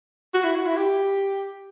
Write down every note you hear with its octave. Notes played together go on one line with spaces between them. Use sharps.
F#4
E4
F#4
E4
G4